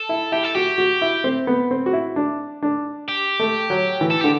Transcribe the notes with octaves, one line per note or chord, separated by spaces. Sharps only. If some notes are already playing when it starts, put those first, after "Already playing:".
Already playing: A4
E4
E4 G4
A4
F#4 G4
F#4
E4
C4
B3
C4
F#4
E4
D4
D4
G4
A3
F#3
E3
A4
D3 G4